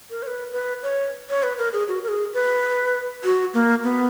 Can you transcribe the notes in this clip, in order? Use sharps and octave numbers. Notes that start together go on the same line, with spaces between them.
A#4
C#5
B4
B4
C#5
C#5
B4
A#4
G#4
F#4
A#4
G#4
B4
F#4
A#3
B3